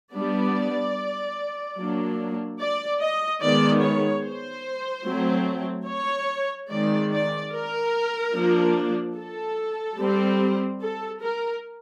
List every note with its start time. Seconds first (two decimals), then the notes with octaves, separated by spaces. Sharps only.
0.13 G3 B3 D4 D5
1.77 F#3 A#3 D4
2.59 D5
3.01 D#5
3.41 D#3 G#3 B3 D5
3.82 C#5
4.24 C5
5.06 F#3 A3 C4
5.88 C#5
6.69 D#3 G#3 C4 D5
7.11 D5
7.52 A#4
8.34 F3 A#3 D4
9.16 A4
9.98 G3 C4
10.81 A4
11.21 A#4